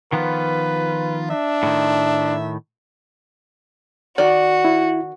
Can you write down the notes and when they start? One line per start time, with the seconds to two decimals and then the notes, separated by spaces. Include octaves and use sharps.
0.13 D#3 F3 B3 F4 B4
1.30 D4 E5
1.63 A2 D#3
4.18 D#3 F#4 D5
4.65 E4